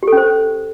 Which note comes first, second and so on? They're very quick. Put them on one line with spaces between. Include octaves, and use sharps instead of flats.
G4 A4 C#4 C5